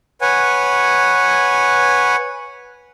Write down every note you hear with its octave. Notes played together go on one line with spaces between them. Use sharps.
B4 C#5 F#5 G#5